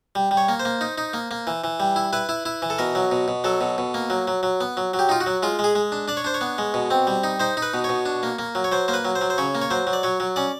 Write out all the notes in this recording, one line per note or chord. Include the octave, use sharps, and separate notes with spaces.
G3
G3
C#5
A#3
C5
A#3
D#4
D#4
A#3
A#3
E3
E3
G3
E4
E4 B4
E4
E4
E3
A4
B2 A#4
F#3
B2
B2
F#3 A4
B2
B2
A#3
F#3
F#3
F#3
B3
F#3
F#3
G4
D#4 F4
F#4
F#3
G#3 F4
G#3
G#4
G#3
D4
D4 D5
C#5
D4 C5
C#5
B3
G#3
B2
C4
G3
D#4
D#4 C5
D#4
B4
B2
B2 C#5
D4
A#3
A#3
F#3
C#5
F#3 C5
A#3 C5
B4
F#3
C5
F#3
C5
C#3 C#5
A#3
C#5
F#3 C5
F#3
D5
F#3 C#5
F#3
C#4 D5